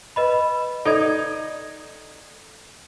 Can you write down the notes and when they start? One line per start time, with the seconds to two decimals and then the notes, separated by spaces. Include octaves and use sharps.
0.16 B4 D#5 B5
0.85 D#4 A4 D5 G#6